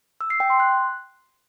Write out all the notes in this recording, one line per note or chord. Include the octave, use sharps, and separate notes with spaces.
E6
C7
G5
C6
F#6